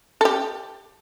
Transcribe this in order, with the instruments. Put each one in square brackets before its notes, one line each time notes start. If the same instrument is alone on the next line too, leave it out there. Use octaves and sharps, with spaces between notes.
[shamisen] A4
G4